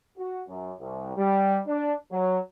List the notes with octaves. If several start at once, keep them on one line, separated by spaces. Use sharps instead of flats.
F#4
F#2
C2
G3
D4
F#3